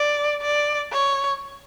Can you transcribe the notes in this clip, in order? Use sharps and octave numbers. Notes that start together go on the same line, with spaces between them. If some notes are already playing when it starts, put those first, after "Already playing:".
Already playing: D5
D5
C#5